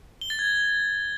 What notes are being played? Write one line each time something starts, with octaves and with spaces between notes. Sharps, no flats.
G7
A6
G#6